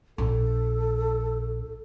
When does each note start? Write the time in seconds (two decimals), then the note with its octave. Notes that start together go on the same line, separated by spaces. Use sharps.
0.18 A#1 A4